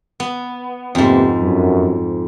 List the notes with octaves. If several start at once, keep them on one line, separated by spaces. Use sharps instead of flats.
B3
F2 G#2 C3 A#3 B3
F#2